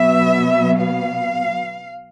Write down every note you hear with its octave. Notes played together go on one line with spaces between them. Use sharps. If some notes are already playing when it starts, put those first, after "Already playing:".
Already playing: B2 F#3 B3 E5
F5